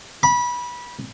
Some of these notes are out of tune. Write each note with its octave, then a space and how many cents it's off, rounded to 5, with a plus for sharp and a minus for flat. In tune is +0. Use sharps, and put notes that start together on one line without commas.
B5 -20